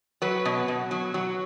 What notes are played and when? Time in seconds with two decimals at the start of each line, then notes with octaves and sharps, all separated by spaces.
0.22 F#3 B4
0.45 B2
0.68 B2
0.91 F#3
1.14 F#3